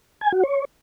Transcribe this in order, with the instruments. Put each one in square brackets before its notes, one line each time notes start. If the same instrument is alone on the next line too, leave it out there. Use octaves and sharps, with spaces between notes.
[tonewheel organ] G#5
F#4
C#5